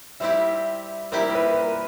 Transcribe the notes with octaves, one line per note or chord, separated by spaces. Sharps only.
G3 C4 E4 G4 E5
G3 C4 E4 G4 A#4
B4
A#4